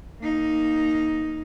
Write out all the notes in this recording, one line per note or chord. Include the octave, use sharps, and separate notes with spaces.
A#3 D#4